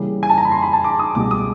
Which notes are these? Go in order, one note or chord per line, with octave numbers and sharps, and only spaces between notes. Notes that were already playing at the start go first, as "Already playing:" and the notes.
Already playing: C#3 E3 G3 A#3
G#5
A5
A#5
B5
C6
B5
A5
D6
D#6
C#2 B2 G3 D6
D#6